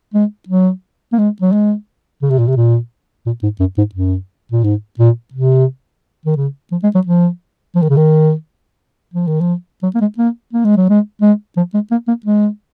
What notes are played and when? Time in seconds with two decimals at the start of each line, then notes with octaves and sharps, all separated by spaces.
0.14 G#3
0.49 F#3
1.13 A#3
1.18 G#3
1.42 F#3
1.52 G#3
2.22 C#3
2.30 C3
2.39 A#2
2.48 C3
2.56 A#2
3.26 A#2
3.43 G#2
3.60 F#2
3.78 G#2
3.95 F#2
4.52 A#2
4.64 G#2
4.99 A#2
5.34 C3
6.26 D#3
6.37 C#3
6.72 F3
6.83 G#3
6.95 F#3
7.07 F3
7.75 F3
7.82 D#3
7.90 C#3
7.97 D#3
9.14 F3
9.27 D#3
9.41 F3
9.83 F#3
9.95 A#3
10.01 G#3
10.18 A#3
10.53 A#3
10.65 G#3
10.77 F#3
10.89 G#3
11.22 G#3
11.57 F3
11.74 G#3
11.91 A#3
12.08 A#3
12.26 G#3